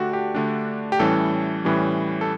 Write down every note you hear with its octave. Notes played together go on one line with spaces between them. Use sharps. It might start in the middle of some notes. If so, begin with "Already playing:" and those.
Already playing: D3 A3 D4 F#4 G4
G4
D3 A3 D4
G4
A2 E3 G3 C#4 A4
A2 E3 G3 C#4
A4